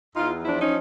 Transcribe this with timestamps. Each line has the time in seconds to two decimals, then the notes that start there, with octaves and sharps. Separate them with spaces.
0.16 E2 D#4 F4
0.44 F3 D4 E4
0.59 C#4 D#4